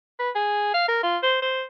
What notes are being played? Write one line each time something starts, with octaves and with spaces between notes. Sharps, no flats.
B4
G#4
F5
A#4
F4
C5
C5